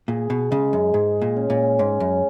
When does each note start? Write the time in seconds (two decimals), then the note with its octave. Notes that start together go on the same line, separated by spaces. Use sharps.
0.08 A#2 G#4
0.30 B2
0.51 C#3 G#3
0.73 F#2
0.94 G#2 G#4
1.22 A#2
1.36 C#4
1.50 A#2
1.79 G#2 C#4
2.00 F#2